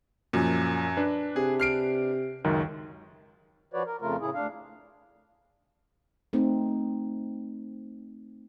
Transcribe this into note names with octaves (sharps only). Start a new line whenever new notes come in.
F#2 A#2 F3
D4 B4
C3 G#4
F6 C7 D7
C#2 F#2 D#3
F3 F#4 B4 C#5 D5
A#4
F2 C#3 A3 F4 A#4
A2 C#3 E4 G#4
D2 D4 F5
A3 C4 D#4